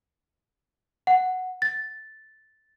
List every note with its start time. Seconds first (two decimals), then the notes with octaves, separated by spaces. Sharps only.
1.07 F#5
1.62 A6